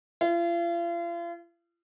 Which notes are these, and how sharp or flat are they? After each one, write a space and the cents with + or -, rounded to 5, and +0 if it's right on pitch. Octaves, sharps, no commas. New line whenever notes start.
F4 -40